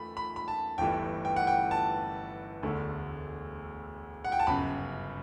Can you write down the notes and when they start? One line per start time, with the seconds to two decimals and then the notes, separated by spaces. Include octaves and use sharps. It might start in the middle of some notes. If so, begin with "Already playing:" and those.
Already playing: E2 A3 B5
0.17 B5
0.36 B5
0.48 A5
0.78 G1 G2 E3 A3 G5
1.25 G5
1.36 F#5
1.47 G5
1.71 A5
2.62 E1 D2 D3 A3
4.25 F#5
4.32 G5
4.40 A5
4.47 G1 F#2 C#3 B5